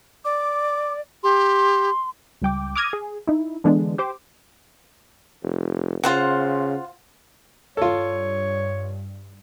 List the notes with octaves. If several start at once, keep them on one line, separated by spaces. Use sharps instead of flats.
D5 D6
G4 C6
C#2 G3 G5 D6
D6 D#6 F6 G#6 A#6 D#7
G#4
D#4 E4
D3 E3 G#3 B3 D4
G4 C5 D6
F1
C#3 F4 C5 F#5
G2 F4 A4 C#5